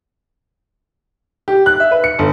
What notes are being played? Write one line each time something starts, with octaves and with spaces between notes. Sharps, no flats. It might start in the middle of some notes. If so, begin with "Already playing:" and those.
G4
F#6
E5
B4
C#7
G1